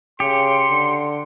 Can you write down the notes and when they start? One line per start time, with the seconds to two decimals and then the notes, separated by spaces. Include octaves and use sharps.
0.20 C#3 G4 C6 C#7
0.70 D3